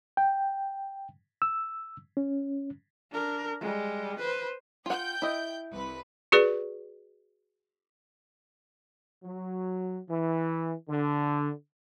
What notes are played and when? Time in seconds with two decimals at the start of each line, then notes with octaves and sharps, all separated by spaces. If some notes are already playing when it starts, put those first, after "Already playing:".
0.17 G5
1.42 E6
2.17 C#4
3.11 D4 A#4
3.60 G3 G#3
4.19 B4 C5
4.86 F4 F#5 G5 G6
5.22 E4 D#5
5.71 C2 B4
6.32 F#4 G#4 B4 D5
9.24 F#3
10.09 E3
10.89 D3